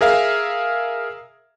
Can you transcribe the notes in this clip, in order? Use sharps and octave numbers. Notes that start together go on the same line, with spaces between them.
G#4 A#4 E5 F5